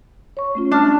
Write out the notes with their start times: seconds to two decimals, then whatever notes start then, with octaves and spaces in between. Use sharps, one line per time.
0.37 C#5 C#6
0.55 A3 C#4 F4
0.72 D4 A5 F6